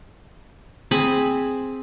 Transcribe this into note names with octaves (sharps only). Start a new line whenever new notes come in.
C4 G#4 B5